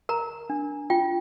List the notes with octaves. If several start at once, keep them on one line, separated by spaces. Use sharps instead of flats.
A#4 A#5
D4
F4 G5